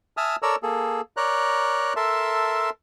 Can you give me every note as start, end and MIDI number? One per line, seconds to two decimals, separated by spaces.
0.17 0.36 76
0.17 0.36 80
0.17 0.36 81
0.17 0.36 87
0.17 0.36 89
0.42 0.56 69
0.42 0.56 70
0.42 0.56 73
0.42 0.56 74
0.42 0.56 82
0.42 0.56 88
0.63 1.01 58
0.63 1.01 68
0.63 1.01 69
1.17 1.93 70
1.17 1.93 73
1.17 1.93 74
1.17 1.93 82
1.17 1.93 90
1.96 2.70 69
1.96 2.70 70
1.96 2.70 76
1.96 2.70 81
1.96 2.70 84